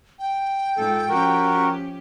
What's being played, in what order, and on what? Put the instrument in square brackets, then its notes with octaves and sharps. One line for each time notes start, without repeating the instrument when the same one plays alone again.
[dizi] G5
[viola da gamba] G#2 F4 [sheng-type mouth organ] A4
[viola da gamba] F3 C#4 G4 [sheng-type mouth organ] F#4 A#4